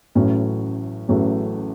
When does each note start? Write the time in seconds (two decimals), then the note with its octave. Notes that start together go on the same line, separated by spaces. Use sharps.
0.15 A1 A2 F#3 A3 C#4
1.08 A1 A2 F#3 A3 C#4